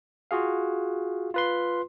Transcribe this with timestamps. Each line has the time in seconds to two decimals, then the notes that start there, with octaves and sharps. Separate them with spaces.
0.31 F4 F#4 G#4 F5
1.34 F4 B4 C6